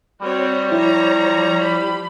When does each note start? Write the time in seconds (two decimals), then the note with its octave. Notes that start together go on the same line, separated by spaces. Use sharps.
0.21 G3 C4 F#4 C#5
0.72 F3 E4 C#5 A#5
1.64 G4 B5